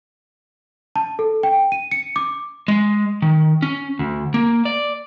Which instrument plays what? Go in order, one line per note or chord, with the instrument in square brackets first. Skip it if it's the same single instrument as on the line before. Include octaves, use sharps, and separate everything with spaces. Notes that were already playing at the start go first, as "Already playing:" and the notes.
[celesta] A5
A4
G5
D#7
C#7
D6
[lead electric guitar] G#3
D#3
C#4
D2
A#3
D5